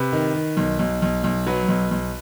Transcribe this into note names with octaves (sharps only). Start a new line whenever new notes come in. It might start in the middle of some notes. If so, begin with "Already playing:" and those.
Already playing: C3 B4
D#3
D#3
B1
B1
B1
B1
F#3 B4
B1
B1